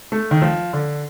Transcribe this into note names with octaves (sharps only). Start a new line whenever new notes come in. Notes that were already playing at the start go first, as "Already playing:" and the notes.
A3
D#3
F3
D3